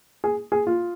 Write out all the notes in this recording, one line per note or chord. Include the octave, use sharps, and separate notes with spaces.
G#4
G#4
F4